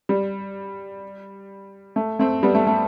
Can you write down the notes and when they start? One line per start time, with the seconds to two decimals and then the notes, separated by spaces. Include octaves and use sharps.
0.09 G3
1.96 A3
2.19 A3 C4
2.43 G3 B3
2.55 A3
2.67 A3